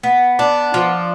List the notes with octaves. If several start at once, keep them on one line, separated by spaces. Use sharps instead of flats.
B3
D4
F3